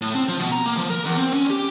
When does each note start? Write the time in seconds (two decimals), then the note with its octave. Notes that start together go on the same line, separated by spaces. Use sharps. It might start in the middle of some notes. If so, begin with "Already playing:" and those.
0.02 A2
0.15 C4
0.28 F3
0.40 B2
0.52 A#5
0.66 A#3
0.77 F3
0.90 A#4
1.05 E2
1.17 C4
1.33 C#4
1.50 G4